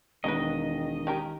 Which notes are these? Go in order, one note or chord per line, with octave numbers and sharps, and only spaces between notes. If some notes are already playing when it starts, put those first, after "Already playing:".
E1 D#3 C#4 A#4 B4 D#5
C#4 G4 A#4